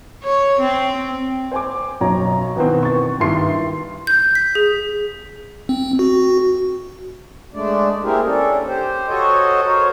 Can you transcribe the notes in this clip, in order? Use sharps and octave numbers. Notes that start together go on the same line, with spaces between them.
C#5
C4
C5 G#5 D6
B1 F#2 C#5 A#5
B2 D#3 E3 B3 C4
C#6 A6
G2 D#3 E4 E5 C6 C7
G6
B6
G#4
C4
F#4
G#3 A3 D4 D5
A#3 C4 E4 G4 G#4 A#4
C#4 D4 A4
G4 C5
F#4 A4 C5 C#5 D#5
A#4 C5 C#5